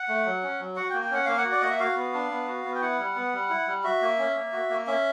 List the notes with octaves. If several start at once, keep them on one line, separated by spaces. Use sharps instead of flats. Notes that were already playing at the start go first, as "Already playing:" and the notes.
Already playing: F#5
A3
F#3
C#4
F#3
F#4 F#5
G5
A#3
G5
C#4 F#5
A#3 F5
F#5
F#4
D5
A#3 D#5
E5
F#4 F5
B3
D4
B3
F#4
B3
G5
E4 F#5
G3
B3
G3
E4
G3
F#4 E5
A#3
C#4
A#3
F#4
A#3
C#4 E5